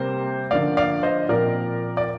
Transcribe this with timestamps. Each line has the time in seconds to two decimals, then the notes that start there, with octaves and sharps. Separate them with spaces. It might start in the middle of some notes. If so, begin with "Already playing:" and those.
Already playing: C3 G3 A#3 C5
0.51 D3 F3 A#3 D5 F5
0.77 D5 F5
1.03 C5 D#5
1.29 A#2 F3 C4 A#4 D5
1.97 D5